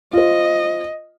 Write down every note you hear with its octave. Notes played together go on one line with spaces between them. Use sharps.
F4 C5 D#5